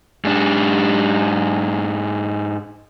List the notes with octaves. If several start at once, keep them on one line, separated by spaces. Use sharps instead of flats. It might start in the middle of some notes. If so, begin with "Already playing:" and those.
G#2 D4